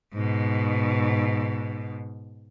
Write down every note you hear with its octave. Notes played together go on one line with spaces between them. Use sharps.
G#2 B2